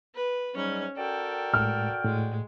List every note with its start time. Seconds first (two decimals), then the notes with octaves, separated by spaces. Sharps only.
0.15 B4
0.55 G#2 F#3 G3 C#4 C#5
0.97 F#4 A4 A#4 D5 G5
1.54 A2 G#3 F6
2.04 A2 G#3